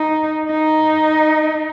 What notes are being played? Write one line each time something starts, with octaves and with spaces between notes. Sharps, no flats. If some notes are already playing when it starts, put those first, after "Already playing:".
Already playing: D#4
D#4